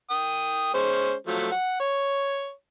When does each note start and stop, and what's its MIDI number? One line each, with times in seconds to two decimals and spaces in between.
0.11 0.73 79
0.11 0.73 87
0.74 1.13 56
0.74 1.13 61
0.74 1.13 72
1.27 1.50 53
1.27 1.50 54
1.27 1.50 57
1.52 1.80 78
1.80 2.52 73